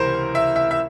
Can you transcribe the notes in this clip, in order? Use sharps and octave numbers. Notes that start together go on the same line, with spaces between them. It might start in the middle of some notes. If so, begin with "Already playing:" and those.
Already playing: C#2 C3 E3 A#4 C5
E5
E5
E5